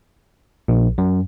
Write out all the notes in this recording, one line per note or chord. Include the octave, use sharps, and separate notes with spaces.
A#1
F#2